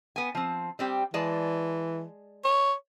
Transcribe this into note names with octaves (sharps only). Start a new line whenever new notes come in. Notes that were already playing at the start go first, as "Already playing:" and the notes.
B3 G#5
F3 C4
G3 C4 G4
E3 G#3 D5 A5
C#5